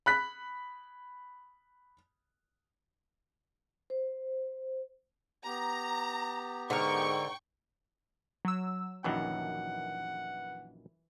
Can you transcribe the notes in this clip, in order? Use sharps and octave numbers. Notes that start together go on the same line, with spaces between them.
B5 F#6 B6
C5
B3 G4 A#5
G#2 D3 A#4 G5 C#6
F#3 E6
A#1 F#2 D#3 E3 F#5